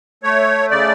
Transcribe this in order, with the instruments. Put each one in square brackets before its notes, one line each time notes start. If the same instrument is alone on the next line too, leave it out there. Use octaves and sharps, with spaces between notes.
[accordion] A3 C#5
C#3 D5